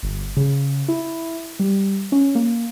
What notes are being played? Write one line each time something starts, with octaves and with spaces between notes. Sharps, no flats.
G1
C#3
E4
G3
C#4
A#3